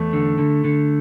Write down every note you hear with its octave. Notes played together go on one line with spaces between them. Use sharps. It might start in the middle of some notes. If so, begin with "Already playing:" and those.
Already playing: E2 A3
D3
D3
D3